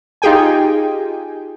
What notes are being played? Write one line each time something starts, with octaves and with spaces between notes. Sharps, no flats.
D#4 F4 G4 G#4 G5 G#5